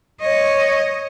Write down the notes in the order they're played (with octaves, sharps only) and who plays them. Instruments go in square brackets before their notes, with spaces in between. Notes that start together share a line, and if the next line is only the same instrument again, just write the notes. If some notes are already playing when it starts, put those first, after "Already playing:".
[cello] C#5 D#5